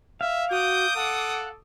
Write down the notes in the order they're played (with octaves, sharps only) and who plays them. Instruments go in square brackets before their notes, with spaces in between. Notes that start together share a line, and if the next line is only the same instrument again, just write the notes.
[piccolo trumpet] E5 [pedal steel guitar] F5
[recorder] F#4 [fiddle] D6 D#6 [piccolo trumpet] G6
[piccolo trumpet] A4 [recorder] F#5